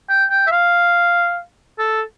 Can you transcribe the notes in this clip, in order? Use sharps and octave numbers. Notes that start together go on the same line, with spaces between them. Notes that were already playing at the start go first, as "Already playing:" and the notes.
G5
G5
E5
F5
A4